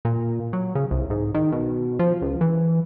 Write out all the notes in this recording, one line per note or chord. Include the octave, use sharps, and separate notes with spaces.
A#2
F#3
C#3
C2
G#2
D#3
B2
F3
C#2
E3